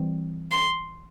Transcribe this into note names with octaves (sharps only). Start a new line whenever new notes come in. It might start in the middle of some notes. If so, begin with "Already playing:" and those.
Already playing: E3 G3 C4
C6